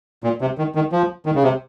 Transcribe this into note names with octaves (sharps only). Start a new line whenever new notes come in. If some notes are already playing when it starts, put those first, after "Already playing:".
A#2
C3
D#3
D#3
F3
D#3
C#3
C3